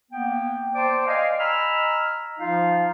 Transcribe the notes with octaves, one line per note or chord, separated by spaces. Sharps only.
A#3 B3 G5
C5 D5 G5 A5 C6 D6
D#5 F5 G#5
D#5 G#5 A#5 B5 E6 F6
F3 D#4 F4 F5